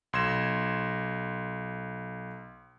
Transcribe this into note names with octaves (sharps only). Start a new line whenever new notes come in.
B1 C6 G#6 A#6 E7